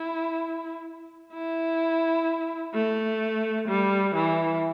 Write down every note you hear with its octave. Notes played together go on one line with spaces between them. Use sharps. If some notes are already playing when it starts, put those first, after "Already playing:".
Already playing: E4
E4
A3
G3
E3